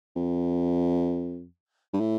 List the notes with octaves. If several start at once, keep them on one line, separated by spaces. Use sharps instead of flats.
F2
G2
A2